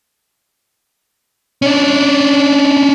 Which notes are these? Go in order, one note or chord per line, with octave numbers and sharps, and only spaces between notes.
C#4 D4